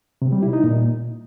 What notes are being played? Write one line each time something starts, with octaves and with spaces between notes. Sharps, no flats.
C3
G3
E4
D#4
A#2